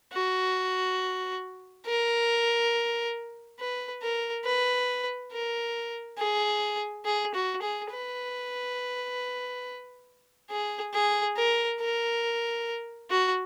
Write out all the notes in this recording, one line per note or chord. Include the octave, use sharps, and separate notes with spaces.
F#4
A#4
B4
A#4
B4
A#4
G#4
G#4
F#4
G#4
B4
G#4
G#4
A#4
A#4
F#4